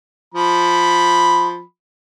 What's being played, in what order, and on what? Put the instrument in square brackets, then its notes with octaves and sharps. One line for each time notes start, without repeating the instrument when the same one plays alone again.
[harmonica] F3 B5